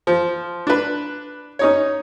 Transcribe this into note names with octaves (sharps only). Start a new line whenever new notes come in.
F3
D4 B4
C#4 D#4 C#5